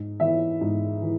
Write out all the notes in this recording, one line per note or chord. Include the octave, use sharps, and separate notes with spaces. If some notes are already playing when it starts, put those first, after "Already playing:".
Already playing: G#2
E3 E5
G#2
E3